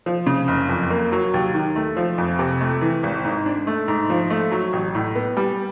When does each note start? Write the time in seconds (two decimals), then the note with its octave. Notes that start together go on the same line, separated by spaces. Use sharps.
0.06 F3
0.26 C#3
0.48 F#1
0.69 F2
0.90 A#3
1.12 F#3
1.34 D#2
1.54 D#3
1.76 A3
1.97 F3
2.18 F2
2.39 C3
2.61 A3
2.81 E3
3.03 G#1
3.25 G#2
3.46 D4
3.67 A3
3.88 G#2
4.10 F3
4.30 A3
4.52 F#3
4.73 A1
4.95 A2
5.15 B3
5.37 G3